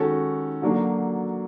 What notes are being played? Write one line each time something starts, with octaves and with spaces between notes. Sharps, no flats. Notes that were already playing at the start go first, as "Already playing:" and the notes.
Already playing: D#3 G#3 C#4 F#4 A4
D3 F#3 A#3 D4 F#4